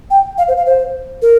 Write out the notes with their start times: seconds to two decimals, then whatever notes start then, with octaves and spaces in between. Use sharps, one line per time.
0.11 G5
0.38 F5
0.48 C5
0.57 F5
0.66 C5
1.22 A#4